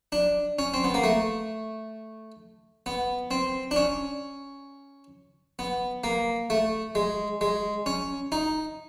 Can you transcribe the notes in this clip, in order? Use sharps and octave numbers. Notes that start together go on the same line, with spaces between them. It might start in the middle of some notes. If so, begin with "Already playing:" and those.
D4
C#4
C4
B3
A#3
A3
B3
C4
D4
C#4
B3
A#3
A3
G#3
G#3
C#4
D#4